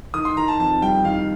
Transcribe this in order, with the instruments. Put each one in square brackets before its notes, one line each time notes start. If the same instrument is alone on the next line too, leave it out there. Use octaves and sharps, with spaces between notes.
[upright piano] D#3 [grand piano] D#6
[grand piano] C6
[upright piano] D#3 [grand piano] A#5
[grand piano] A5
[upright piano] F2 [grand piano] A5
[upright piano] G3 [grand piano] G5
[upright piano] D#3 [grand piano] F5